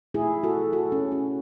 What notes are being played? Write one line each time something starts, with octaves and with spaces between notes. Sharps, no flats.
B2 A3 E4 G#4
F#4 A4
F#4 A4
C#4
C#4